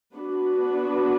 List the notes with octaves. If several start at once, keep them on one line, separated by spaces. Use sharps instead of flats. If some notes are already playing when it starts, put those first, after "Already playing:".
B3 D4 F#4 B4